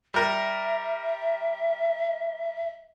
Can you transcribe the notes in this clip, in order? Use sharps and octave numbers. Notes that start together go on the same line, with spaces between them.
G3 A#4 E5